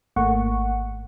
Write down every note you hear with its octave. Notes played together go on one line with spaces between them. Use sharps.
G#1 A3 A#3 F#5 C#6